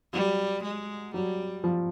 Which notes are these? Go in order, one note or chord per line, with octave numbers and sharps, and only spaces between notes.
F#3 G3
G#3
F#3 G3
F3